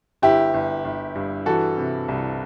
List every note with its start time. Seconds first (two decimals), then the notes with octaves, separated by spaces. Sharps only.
0.22 G1 E4 G4
0.54 G1
0.85 G1
1.15 G2
1.46 E3 F#4 A4
1.77 C3
2.08 C2